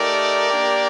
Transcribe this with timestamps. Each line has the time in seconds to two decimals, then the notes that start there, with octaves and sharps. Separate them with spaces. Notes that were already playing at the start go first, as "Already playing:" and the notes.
Already playing: A3 D#4 G4 A#4 D5
0.48 A#3 D4 G4